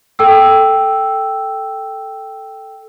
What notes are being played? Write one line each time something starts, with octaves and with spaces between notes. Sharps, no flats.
A4 G5 E6